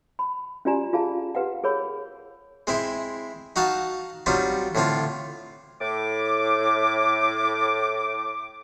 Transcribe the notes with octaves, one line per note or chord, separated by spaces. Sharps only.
B5
C#4 F4 G4 D5 G#5 A#5
F4 G#4 F5 A5
G4 B4 F5 F#5
G#4 A#4 C#5 B5
G#3 C4 E4
D#4 F#4 F5 F#5 A5
F#3 G3 C4 D#4 F4
A2 D3 C4 F4
A2 D6